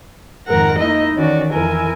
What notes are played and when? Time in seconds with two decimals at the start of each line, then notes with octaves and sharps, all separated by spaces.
0.47 F2 G#2 D#3 A#4 F#5 A#6
0.78 A#3 D#4 E4 D#5
1.15 D#3 E3 C#4 F#4 D5
1.52 F2 E3 E4 A#4 G#5